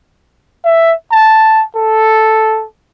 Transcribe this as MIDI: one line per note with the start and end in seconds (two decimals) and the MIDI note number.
0.65 0.94 76
1.12 1.63 81
1.76 2.65 69